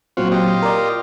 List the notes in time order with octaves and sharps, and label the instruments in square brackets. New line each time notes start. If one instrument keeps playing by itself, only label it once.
[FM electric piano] A#2 F#3 C4 [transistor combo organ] F4 F#4
[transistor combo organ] F4 G4 D#5
[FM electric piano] A#4 D5